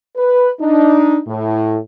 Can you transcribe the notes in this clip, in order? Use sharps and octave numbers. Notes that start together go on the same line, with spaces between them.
B4
D4 D#4
A2